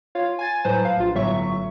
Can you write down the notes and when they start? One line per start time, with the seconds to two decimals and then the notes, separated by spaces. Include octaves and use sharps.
0.15 F4 C#5 F5
0.39 G#5 G#6 A6
0.64 A2 F#3 B4 C5 A5
0.85 F5
0.97 A#1 F4
1.14 G1 A2 F#3 E5 C#6